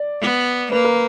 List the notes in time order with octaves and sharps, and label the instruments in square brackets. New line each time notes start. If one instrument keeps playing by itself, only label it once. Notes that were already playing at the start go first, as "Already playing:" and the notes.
Already playing: [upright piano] D5
[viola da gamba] B3
[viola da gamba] A#3 [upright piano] B4
[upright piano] A#4